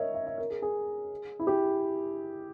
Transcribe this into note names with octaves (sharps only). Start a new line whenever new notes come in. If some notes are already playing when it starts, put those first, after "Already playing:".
Already playing: A#4 C#5 D#5 E5
E5
E5
A#4
G#4
G#4
E4
G4